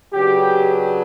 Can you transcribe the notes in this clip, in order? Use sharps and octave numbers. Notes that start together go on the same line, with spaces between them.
C#3 F#3 B3 D4 G4